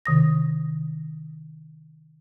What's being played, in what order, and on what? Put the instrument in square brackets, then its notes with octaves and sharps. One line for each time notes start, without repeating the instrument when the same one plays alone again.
[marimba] C3 D#3 D#6 A#6